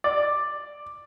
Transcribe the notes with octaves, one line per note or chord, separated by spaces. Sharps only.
D5